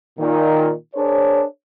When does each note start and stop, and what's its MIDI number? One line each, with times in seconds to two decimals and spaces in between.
0.19 0.71 46
0.19 0.71 51
0.95 1.43 62
0.95 1.43 68
0.95 1.43 70
0.95 1.43 72
0.95 1.43 73